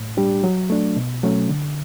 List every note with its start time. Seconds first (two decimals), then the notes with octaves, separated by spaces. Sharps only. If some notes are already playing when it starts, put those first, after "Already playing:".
Already playing: A2
0.17 G3 D4 G4
0.44 F#3
0.70 A3 D4
0.96 B2
1.23 F#3 A3 C#4
1.49 D3